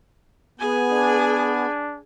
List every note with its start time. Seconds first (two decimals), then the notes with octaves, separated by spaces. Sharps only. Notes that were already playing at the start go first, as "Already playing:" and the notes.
0.60 B3 G#4 G#5
0.92 D4